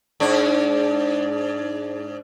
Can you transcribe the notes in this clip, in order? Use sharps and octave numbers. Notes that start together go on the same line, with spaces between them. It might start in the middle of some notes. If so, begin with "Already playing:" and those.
G#2 D4